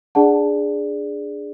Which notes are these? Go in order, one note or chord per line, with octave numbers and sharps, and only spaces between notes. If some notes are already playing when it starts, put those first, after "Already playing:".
D4 G#4 D5 F#5 A5